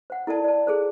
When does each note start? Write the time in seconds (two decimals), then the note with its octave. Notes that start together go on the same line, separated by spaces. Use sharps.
0.10 C5 F#5
0.27 E4 A4 A#4 D5 A5
0.44 D5 A5
0.67 G#4 A4 C5